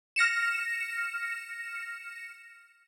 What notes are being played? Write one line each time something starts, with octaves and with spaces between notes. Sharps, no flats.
F6 A#6 C#7 E7